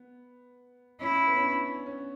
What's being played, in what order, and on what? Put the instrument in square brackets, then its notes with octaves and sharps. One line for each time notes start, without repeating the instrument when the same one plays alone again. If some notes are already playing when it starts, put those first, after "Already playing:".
Already playing: [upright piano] B3
[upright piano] C#4 [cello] E4
[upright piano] B3
C#4
D4
C#4